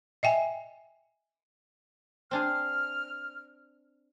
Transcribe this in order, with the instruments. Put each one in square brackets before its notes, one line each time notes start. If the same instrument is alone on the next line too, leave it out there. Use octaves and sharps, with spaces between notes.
[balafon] D#5 E5 G5 G#5
[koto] C4 D4 G#4 [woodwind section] F6